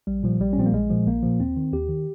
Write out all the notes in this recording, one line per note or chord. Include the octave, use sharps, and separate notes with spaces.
A#1 G3
A#2 F3
A#1 G3
C#4
A#2 F3 C4
A#3
A#1 G#3
A#2 F3
A#1 A#3
A#2 F3
D#2 C4
D#3
D#2 G4
D#3